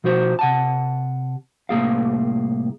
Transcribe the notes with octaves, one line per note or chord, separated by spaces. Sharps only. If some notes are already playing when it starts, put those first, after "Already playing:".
B2 F3 F#4 C5
C3 F#5 A5
C2 A2 A#3 G#4 F5